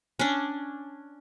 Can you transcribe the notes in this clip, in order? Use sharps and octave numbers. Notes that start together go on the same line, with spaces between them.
C#4 D4